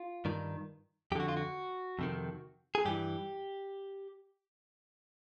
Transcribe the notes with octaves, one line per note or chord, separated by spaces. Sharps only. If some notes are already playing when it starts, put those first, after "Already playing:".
Already playing: F4
G2 D#3
F2 D3 F#4 G4
F4
F#4
F2 C3 D#3
G#4
G2 E3 G4